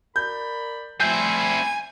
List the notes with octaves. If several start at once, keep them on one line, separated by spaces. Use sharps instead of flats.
A#4 D5 B5 G6
F3 G3 A3 C4 E4 G#5 G6